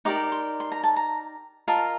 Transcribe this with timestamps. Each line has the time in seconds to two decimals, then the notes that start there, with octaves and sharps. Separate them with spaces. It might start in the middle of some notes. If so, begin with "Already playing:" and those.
0.05 D#4 G4 A#4 D5 D6
0.32 C6
0.60 C6
0.72 A#5
0.84 A5
0.96 A#5
1.68 F4 A#4 D#5 A5